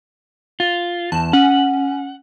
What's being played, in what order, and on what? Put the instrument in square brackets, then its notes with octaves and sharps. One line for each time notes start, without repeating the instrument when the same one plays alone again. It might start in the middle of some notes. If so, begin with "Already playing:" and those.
[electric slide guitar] F4
[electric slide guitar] E2 [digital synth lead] A5
[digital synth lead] C#4 [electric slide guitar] F#5